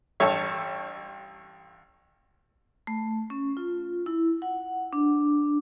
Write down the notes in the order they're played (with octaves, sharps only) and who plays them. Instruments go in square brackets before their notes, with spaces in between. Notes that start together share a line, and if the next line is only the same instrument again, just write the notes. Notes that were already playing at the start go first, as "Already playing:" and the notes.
[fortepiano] A1 G2 A4 C#5 E5
[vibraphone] A3
C#4
F4
E4
F#5
D4